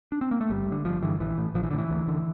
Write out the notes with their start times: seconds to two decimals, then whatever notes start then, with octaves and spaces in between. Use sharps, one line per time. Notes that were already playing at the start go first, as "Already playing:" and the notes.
0.12 D4
0.21 C4
0.31 A#3
0.41 A3
0.50 G1 G3
0.67 G2
0.72 D3
0.85 G1 F3
1.02 G2 D3 E3
1.20 A#1 E3
1.38 A2
1.54 A#1 F3
1.63 E3
1.71 A2 D3
1.78 E3
1.90 D2
2.08 D3